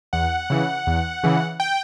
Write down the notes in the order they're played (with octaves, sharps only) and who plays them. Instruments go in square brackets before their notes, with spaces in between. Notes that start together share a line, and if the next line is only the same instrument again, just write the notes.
[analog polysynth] E2 F#5
C#3 E3
E2
C#3 E3
G5